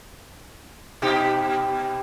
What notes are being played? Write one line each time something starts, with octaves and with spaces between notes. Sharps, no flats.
B2 D#4 G4